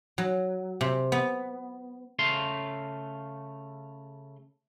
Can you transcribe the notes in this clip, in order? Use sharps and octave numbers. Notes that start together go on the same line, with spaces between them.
F#3
C3
B3
C#3 A3 F5 C6